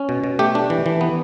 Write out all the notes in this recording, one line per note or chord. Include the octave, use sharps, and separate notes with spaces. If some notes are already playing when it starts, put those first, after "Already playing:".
Already playing: C#4
B2
B2
A3 G4
D4
E3
E3
B3